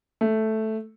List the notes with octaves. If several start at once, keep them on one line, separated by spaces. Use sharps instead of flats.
A3